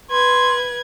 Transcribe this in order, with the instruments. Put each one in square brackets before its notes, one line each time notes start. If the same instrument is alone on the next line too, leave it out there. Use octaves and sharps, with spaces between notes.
[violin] B4 G#6 [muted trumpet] C6